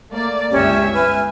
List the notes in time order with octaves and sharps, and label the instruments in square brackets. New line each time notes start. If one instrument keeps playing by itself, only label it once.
[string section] A3 A#3 D5
[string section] G1 C#2 E5 [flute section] C#4 G4
[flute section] B4 G#5 F6